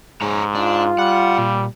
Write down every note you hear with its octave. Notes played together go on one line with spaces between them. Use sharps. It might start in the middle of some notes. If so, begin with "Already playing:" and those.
G#2 G#4 C#5 A#5
D4 F4
G3 F#5
A#2